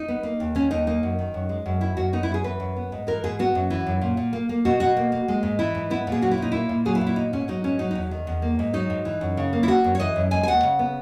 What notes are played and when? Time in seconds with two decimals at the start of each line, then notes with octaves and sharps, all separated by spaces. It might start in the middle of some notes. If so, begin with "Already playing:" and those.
Already playing: D#4
0.08 B3
0.23 A#3
0.40 D#2
0.55 D#3 C#4
0.71 D#2 D#4
0.87 A#3 D#4
1.03 F#2
1.19 D#3
1.34 F#2
1.49 G#3
1.66 F#2
1.81 D#3 E4
1.97 F#2 F#4
2.13 B3 D#4
2.23 E4
2.28 F#2
2.34 G#4
2.44 E3 B4
2.60 F#2
2.76 B3
2.92 G#2
3.07 E3 A#4
3.24 G#2 G#4
3.39 B3 F#4
3.55 F#2
3.70 E3
3.86 F#2
4.01 A#2
4.17 A#2
4.33 A#3
4.49 A#3
4.65 B2 F#4
4.80 B2 F#4
4.97 A#3
5.12 A#3
5.28 G#3
5.43 G#2
5.59 E3 E4
5.75 G#2
5.90 B3 E4
6.07 A#2 G#4
6.22 F#3 F#4
6.31 E4
6.38 A#2 D#4
6.52 A#3 E4
6.69 A#2
6.85 F#3 G#4
6.95 E4
7.01 A#2
7.07 E4
7.16 B3 D#4
7.33 G#2 C#4
7.48 F#3 D#4
7.64 G#2 C#4
7.79 F#3 D#4
7.91 D#4
7.95 E2
8.11 D#3
8.27 E2
8.42 A#3
8.59 G#2
8.73 F#3 D#4
8.90 G#2
9.05 E3
9.21 F#2
9.37 C#3
9.53 A#3
9.63 E4
9.68 B3 F#4
9.84 F#2
9.95 C#5
10.00 E3 D#5
10.16 F#2
10.31 G#3 G#5
10.43 G#5
10.48 D#2 F#5
10.63 C#3
10.79 B3